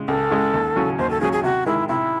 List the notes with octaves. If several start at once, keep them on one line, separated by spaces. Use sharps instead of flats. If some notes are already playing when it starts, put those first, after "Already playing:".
Already playing: C#3 G#3
C#2 A4
C#3 G#3
D#2
C#3 F#3 C#4
D#2 C5
A4
C#3 F#3 C#4 G#4
G#4
C3 F#4
D#3 G#3 E4
C3 E4